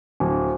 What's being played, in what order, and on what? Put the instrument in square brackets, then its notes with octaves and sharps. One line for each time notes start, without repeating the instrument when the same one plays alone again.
[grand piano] D1